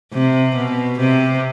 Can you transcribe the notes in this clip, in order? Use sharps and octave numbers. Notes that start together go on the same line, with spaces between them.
C3
B2
C3